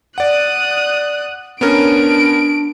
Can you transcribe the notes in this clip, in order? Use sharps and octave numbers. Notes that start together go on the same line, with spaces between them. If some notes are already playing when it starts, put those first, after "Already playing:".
D5 F#5 D#6 F#6
B3 C#4 D4 A#4 D7